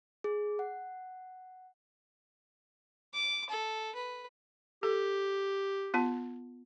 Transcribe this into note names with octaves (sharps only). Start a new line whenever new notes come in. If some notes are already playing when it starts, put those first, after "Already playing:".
G#4
F#5
D6
A4
B4
G4 A4
B3 F4 A5